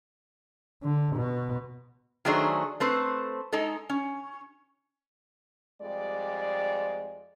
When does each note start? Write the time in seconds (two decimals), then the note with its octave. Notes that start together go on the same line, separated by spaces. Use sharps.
0.83 D3
1.16 B2
2.25 D#3 F#3 A3 D4 G#4 C5
2.80 A3 C4 B4 C5
3.53 G#3 D#4 A4
3.89 C#4
5.81 F2 G3 G#3 D5